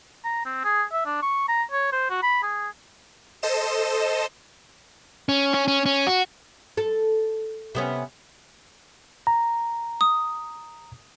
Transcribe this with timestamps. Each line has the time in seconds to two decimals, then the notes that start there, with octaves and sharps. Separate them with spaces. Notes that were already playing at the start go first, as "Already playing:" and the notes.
0.25 A#5
0.46 C4
0.65 G#4
0.92 E5
1.06 D4
1.22 C#6
1.49 A#5
1.72 C#5
1.92 C5
2.10 F#4
2.23 B5
2.43 G#4
3.43 A4 C5 D#5 E7
5.29 C#4
5.54 C#4
5.68 C#4
5.86 C#4
6.07 F#4
6.77 A4
7.75 C3 B3 C#4
9.27 A#5
10.01 D#6